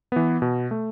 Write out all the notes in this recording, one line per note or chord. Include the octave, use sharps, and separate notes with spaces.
E3 B3
B2
A3